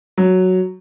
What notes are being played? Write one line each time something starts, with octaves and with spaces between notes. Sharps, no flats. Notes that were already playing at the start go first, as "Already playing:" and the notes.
F#3